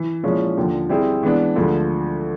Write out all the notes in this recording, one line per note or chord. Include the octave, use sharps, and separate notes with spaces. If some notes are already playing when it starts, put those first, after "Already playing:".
Already playing: E3
A#2 F3 G#3 C#4 E4
D#2 D3 F3
G3 C4 E4 G#4
E3 G#3 B3 D4
D2 D3 F3 G#3